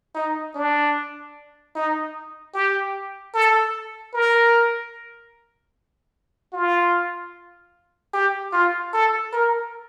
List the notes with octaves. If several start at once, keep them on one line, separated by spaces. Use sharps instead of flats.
D#4
D4
D#4
G4
A4
A#4
F4
G4
F4
A4
A#4